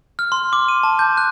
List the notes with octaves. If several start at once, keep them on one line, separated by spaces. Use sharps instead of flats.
F6
C6
D6
D#7
A5
G6
F#6